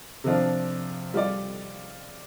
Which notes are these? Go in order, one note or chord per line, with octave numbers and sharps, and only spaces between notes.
C3 F3 D4 F4
G3 F4 D5